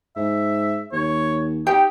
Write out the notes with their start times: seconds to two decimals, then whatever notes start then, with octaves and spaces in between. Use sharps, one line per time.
0.16 G#2 E5
0.92 D#2 C#5
1.67 D#4 G4 G5